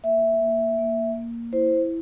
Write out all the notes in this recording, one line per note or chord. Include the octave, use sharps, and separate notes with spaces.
A#3 E5
A#3
A#3
A#3
E4 C5